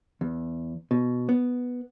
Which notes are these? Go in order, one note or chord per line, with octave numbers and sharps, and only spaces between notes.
E2
B2
B3